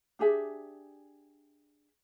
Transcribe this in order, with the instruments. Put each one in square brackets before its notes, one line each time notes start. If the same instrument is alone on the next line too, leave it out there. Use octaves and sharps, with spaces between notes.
[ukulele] D4 G4 G#4 E5